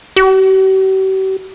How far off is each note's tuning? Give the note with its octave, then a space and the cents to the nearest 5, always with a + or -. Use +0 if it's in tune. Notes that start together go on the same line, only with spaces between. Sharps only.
G4 -45